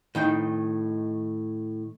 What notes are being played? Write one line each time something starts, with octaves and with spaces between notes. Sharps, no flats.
A2 D#3 D#4 G5